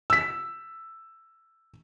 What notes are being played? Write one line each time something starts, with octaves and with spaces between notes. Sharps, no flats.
E6 B6